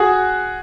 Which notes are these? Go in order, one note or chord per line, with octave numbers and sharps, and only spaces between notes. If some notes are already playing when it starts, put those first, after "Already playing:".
Already playing: F#4 G#4